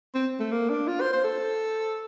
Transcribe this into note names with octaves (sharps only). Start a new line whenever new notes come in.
C4
A3
A#3
D4
F4
C5
C5
A4